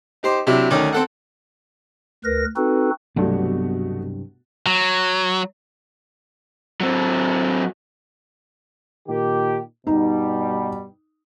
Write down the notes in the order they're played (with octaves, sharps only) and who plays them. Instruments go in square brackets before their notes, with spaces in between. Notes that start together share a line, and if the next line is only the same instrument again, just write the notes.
[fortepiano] D#4 G4 C5
C3 F#3 D4 E4
D2 D#3 C#4 D6
C4 A4 F#5
[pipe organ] D2 A#4 B4 A#6
C4 D#4 F#4 A4 B4
[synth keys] C2 G2 [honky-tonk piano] B2 A3 F#4 [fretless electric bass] F#3 B3
[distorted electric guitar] F#3
[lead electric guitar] F#3 C4
[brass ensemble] A#2 D#3 G4
[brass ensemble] G2 B2 G3 [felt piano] D#4